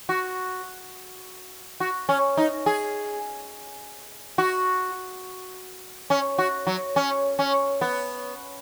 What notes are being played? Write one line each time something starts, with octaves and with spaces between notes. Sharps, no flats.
F#4
F#4
C#4
D#4
G#4
F#4
C#4
F#4
F#3
C#4
C#4
B3